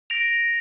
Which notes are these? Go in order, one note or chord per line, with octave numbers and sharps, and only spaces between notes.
A#6 D7 F7